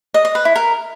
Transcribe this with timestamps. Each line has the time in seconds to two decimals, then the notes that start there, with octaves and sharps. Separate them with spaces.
0.14 D#5
0.25 D#5
0.35 B4
0.45 E4
0.56 A#4